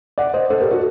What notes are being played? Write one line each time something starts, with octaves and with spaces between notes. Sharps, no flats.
D5 F#5
C5 D#5
A4 C5
G4 A#4
F#4 A4